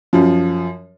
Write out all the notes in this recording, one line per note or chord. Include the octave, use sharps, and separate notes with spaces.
F#2 F3